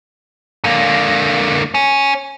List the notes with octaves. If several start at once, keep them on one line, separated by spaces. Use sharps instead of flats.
D3 A#3
C#4